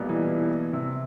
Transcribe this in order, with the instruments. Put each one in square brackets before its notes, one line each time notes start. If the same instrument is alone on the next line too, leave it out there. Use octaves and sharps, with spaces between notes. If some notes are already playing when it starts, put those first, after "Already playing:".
Already playing: [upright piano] B1 A#2 G3 B3
[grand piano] E3
C3